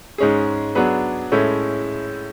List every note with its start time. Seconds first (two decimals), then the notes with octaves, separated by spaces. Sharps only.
0.18 G#2 G#3 C#4 G#4
0.75 F#3 B3 D4 G#4 B4
1.32 A2 G#3 C#4 E4 A4